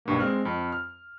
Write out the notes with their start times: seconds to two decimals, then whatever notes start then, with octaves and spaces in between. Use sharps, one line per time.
0.05 B1 G2 A#3
0.19 G#3 C4 F6 F#6
0.45 F2
0.72 F6